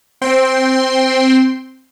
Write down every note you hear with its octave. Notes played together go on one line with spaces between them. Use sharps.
C4 G5 C6